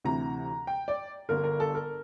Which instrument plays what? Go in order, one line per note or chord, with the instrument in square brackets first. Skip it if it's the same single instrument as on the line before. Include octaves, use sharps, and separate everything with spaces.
[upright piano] D2 C3 E3 A#5
G5
D5
G1 G2 D3 A#4
A#4
A4
A#4